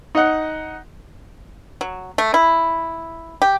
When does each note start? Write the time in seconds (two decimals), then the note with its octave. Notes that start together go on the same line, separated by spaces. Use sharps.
0.15 D#4 D#5 F#5
1.81 F#3
2.18 A3
2.34 E4
3.42 G4